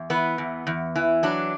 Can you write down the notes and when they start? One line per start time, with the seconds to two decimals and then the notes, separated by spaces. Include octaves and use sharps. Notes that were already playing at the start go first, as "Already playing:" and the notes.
Already playing: E2
0.10 E3 B3
0.38 E2
0.67 E2
0.96 E3
1.23 F#3 D4